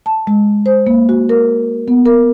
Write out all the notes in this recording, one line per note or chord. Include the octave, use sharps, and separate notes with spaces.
A5
G#3
C5
A#3
F#4
A#4
B3
A#4